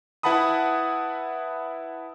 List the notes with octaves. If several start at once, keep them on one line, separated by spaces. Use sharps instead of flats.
E4 B4 F#5 A5 B5 D#6